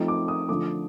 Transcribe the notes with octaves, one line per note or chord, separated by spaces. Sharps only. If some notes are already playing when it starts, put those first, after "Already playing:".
Already playing: F3 A3 C4 D#4
D6
D#6
D3 F3 A3 D6